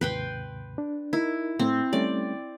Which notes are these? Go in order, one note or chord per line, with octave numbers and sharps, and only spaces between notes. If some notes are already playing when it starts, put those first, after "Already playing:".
D#2 G#2 C3 B4 G5 C6
D4
D#4 E4 A#4
A2 A3 C4
G3 A3 C#4 D5